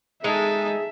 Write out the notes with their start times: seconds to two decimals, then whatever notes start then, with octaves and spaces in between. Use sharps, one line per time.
0.24 G#3 D#4 G#4 A4 E5